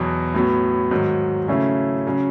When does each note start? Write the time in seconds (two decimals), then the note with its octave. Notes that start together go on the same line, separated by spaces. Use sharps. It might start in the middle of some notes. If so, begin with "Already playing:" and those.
Already playing: E2 B2 F#3
0.34 A2 F#3 B3
0.91 G#2 D#3 F#3
1.48 C#3 F#3 A3 C#4 E4
2.07 C#3 F#3 C#4